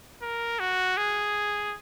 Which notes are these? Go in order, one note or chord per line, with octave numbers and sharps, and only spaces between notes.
A#4
F#4
G#4